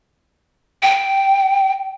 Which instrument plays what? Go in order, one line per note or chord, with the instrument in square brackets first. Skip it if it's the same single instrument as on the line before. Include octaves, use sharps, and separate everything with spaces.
[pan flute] G5